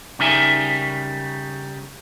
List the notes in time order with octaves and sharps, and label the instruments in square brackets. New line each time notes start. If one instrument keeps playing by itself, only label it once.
[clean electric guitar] C#3 G3 D#4 A#4 E5 G#5